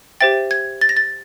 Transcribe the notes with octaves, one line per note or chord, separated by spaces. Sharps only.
G4 C5 E5 G5 A6
G#6
A6
A#6
A6